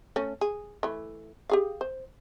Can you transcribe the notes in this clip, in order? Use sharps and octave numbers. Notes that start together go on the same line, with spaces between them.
A3 C#4
G#4
E3 A3
G4 G#4 F5
C5